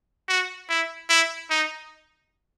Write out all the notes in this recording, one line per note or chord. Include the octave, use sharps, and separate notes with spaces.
F#4
E4
E4
D#4